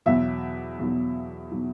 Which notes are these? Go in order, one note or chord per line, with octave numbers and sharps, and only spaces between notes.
E2 B2 F#3 E5
E2 B2 F#3
B2 F#3